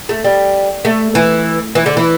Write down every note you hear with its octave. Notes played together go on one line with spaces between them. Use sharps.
A3
G3
A3
E3
E3
D3
E3